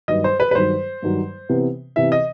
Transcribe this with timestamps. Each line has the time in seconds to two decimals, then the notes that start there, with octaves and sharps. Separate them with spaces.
0.08 G2 D#3 F#3 D#5
0.24 C5
0.40 B4
0.51 B4
0.55 G2 D#3 F#3 C5
1.02 G2 D#3 F#3
1.49 C3 E3 B3
1.96 C3 E3 B3 E5
2.12 D#5